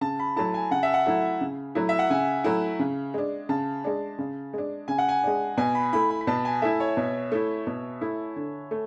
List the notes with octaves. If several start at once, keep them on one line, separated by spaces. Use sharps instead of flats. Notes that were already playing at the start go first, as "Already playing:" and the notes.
C#3 A5
B5
F#3 A3 E4 A5
G#5
C#3 F#5
E5
F#5
F#3 A3 E4
C#3
F#3 A3 E4
E5
F#5
C#3 G#5
F#3 A3 E4
C#3
G#3 D4
C#3 A5
G#3 D4
C#3
G#3 D4
C#3 G#5
F#5
G#5
G#3 D4
B2 G#5
B5
A3 E4 B5
B5
B5
B2 A5
G#5
A3 E4 E5
C#5
B2
A3 E4
B2
A3 E4
D3
A3